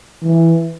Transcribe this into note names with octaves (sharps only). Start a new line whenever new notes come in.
E3